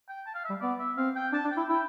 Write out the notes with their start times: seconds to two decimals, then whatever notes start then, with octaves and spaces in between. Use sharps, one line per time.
0.09 G5
0.27 A5
0.35 F5
0.45 E5
0.50 G3
0.61 B3 D5
0.79 E5
0.97 C4 F5
1.16 G5
1.33 D4 A5
1.45 D4
1.51 G5
1.57 E4
1.69 E4 G5